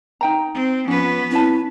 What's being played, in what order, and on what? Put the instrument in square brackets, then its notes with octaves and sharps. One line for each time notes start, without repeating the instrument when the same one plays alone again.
[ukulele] D#4 G5 A#5
[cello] C4
[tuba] F3 [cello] B3 B4 [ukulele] C#4
[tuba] C4 [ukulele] C#4 C#5 A5 [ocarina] E4